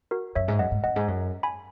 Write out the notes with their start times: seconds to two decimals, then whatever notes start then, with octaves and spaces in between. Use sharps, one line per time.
0.11 F#4 A#4
0.35 F#2 C#5 E5
0.48 G#2
0.59 F#2 D#5 F#5
0.71 G#2
0.84 F#2 D#5 F#5
0.96 G#2
1.08 F#2
1.43 G#5 B5